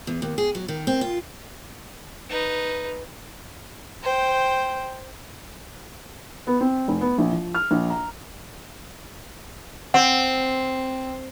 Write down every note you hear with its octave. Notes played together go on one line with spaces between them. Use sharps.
E2
D#2
G#4
F#3
D#3
C4
F4
D#4 B4
C5 G5
B3
C4
F1
B3
A#1
F3
F6
A#1
A#5
C4 F#5